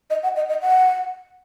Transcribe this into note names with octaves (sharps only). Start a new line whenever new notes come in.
D#5
F#5
D#5
D#5
F#5